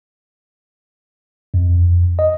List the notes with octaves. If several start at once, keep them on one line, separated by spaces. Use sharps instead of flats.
F2
D#5